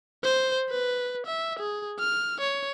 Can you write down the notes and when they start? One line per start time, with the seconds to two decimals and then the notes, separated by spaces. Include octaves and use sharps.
0.24 C5
0.70 B4
1.26 E5
1.59 G#4
1.99 F6
2.41 C#5